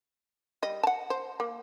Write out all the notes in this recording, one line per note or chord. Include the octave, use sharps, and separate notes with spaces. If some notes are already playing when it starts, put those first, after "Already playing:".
G3 D#5
F#5 A5
C5
A#3